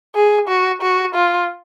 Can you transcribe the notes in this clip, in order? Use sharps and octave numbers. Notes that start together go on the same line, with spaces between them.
G#4
F#4
F#4
F4